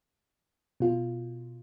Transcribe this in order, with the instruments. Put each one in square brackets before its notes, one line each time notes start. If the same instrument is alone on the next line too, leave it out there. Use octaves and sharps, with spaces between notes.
[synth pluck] B2 F4